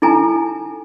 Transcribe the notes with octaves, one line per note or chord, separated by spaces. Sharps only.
D#4 E4 A4 G#5 A#5